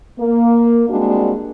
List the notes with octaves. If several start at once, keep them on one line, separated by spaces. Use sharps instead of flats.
A#3
G3 G#3 A#3 C4 D4 F#4